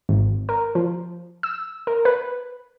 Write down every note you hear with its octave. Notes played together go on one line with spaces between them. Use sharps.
G#1
A#4
F3
E6
A#4
B4